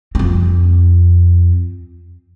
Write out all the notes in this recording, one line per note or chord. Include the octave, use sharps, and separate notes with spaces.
F2 C4